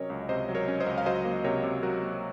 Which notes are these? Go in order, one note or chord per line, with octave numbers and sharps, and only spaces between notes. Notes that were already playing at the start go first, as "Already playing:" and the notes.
Already playing: C3 F#3 C#4 A#4 C#5 D#5
C#2
C3 C5 D#5
F#3
A#4 C#5
C#4
C5 D#5
C#2
F5
F#3 C5 D#5
A#3
C3 A#4 C#5
C3
F#3 F#4 A#4
A#3